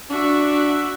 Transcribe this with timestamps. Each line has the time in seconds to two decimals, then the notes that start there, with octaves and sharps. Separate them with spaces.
0.10 D4 F#4 E5